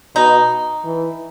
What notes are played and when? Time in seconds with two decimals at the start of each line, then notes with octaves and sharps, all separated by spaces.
0.15 B2 D#4
0.84 E3